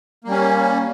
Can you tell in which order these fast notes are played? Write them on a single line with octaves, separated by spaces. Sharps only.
A#3 G3 C#4